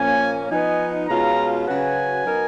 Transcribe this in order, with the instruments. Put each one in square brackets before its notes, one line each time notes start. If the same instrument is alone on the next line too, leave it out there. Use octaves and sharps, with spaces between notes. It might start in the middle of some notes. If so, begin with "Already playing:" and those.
Already playing: [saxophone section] A#2 F3 A#3 C#4 [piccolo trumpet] G#5
[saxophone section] F3 B3 D#4 [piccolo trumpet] G#5
[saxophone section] B2 G#3 C#4 F4 [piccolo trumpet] A#5
[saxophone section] C#3 F#3 C#4 F#4 B4 [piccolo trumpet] G#5
[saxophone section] F#3 B3 D#4 A#4